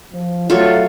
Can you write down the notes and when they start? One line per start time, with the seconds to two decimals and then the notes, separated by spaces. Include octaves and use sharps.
0.13 F3
0.50 F#3 A3 F4 F#4 A4 C#5